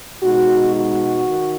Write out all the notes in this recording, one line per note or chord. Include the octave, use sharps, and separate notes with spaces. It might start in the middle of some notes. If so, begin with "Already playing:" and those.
B2 G#3 D#4 F#4
F#4
D#3